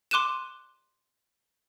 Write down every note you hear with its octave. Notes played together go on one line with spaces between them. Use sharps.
C6 D6 F#6 D#7 E7